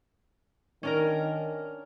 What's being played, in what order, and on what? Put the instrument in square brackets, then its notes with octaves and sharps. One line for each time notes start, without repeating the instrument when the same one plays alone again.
[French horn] D#3 [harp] C#4 D4 A#4